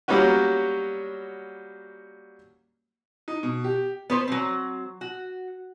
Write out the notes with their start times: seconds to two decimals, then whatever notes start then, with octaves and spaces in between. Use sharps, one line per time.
0.08 F#3 G3 A#3 B3 C#4 F#4
3.28 D#4
3.43 B2
3.64 G4
4.10 B3 B4 C5
4.28 F#3 C4
5.01 F#4